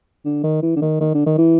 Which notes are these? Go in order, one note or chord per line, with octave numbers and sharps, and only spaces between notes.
D3
D#3
E3
D3
D#3
D#3
D3
D#3
E3